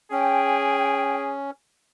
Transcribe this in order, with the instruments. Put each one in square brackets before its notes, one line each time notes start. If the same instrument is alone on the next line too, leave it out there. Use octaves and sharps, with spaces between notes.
[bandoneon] C#4 [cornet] G#4 [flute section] G5